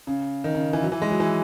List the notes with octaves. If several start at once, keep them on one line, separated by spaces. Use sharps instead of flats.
C#3
D#3
C#3
E3
F#3
E3
G#3
F#3
E3